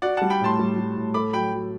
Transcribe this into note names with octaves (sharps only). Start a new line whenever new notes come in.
F#4 D5 F#5
G3 F#5 A5
G5 B5
A2 A5 C6
G3
G3
A2
A4 B5 D6
F#3 G5 B5
F#3